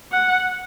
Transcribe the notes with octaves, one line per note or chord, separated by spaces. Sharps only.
F#5